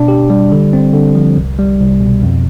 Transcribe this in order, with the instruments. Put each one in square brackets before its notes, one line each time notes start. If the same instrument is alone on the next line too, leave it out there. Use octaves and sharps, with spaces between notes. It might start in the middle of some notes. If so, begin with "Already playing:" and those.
Already playing: [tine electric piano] B2 D4
G4
G3
D3
C4
D3
F3
C2
G3
C2
B2
F2